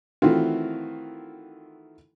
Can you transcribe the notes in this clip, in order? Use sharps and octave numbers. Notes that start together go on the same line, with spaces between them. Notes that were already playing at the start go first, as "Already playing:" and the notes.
D#3 E3 A3 C4 F4 F#4